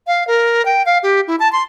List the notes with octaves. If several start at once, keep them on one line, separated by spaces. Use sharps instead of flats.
F5
A#4
G5
F5
G4
E4
A5
C6